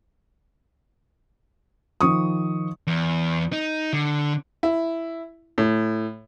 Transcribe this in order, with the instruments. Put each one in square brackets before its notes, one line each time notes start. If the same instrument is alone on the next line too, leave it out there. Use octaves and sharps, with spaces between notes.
[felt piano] D#3 F3 C#6 D#6
[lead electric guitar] E2
D#4
D3
[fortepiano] E4
A2